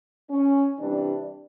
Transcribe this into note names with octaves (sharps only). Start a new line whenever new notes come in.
C#4
C3 E3 G3 D4